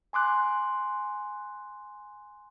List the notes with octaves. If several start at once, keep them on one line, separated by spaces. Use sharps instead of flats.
G#5 C6 D6 F#6